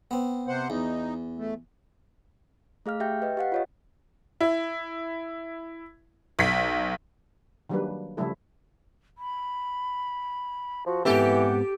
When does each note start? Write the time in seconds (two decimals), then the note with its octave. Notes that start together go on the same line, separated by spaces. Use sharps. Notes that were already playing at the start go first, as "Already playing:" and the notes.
0.11 B3 C4
0.48 C3 C5 F#5
0.70 E2 D#4
1.38 A3
2.86 A3 G#4 F5 F6
3.00 G4 E5 G5 G6
3.22 B4 D#5
3.37 G4 F5 F#5
3.52 F4 C#5 D#5
4.41 E4
6.39 B1 B6
7.69 D#3 F#3 G3 A#3 D4 B4
8.17 C#3 F3 G3 A3 E4 A4
9.18 B5
10.86 F3 F#4
11.05 G#2 E3 B3 C4 G4 A4 F#5